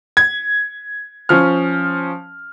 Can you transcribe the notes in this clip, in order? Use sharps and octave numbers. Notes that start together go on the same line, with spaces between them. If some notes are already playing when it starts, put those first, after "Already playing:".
G#6
F3 C#4 F6